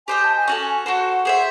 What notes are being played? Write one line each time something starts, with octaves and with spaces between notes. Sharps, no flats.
G4 C5 D#5 G5 G#5
A5
G#5
C#4 F#4 A4
F#4 A4 C5 F#5
G#4 C5 E5